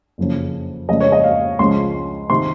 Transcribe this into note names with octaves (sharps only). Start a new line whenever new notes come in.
F#1 F2 C#3
F2 C#3 G#3 D#5
C#5
D#5
F5
C#2 C#3 F3 G#3 C6
C3 D#3 C6